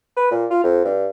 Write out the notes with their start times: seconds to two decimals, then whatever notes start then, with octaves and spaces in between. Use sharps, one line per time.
0.17 B4
0.31 A#2
0.51 F4
0.64 F2
0.85 G2